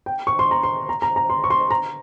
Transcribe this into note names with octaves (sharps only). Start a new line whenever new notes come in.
G5
C#6
C6
A#5
C6
A#5
A#5
A#5
C6
C#6
C6
A#5